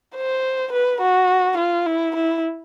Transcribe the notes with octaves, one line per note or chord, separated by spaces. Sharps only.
C5
B4
F#4
F4
E4
E4